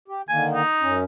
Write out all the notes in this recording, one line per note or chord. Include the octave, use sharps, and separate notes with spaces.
G4
D3 D#3 A#3 G#5
D#4
F#2 C#4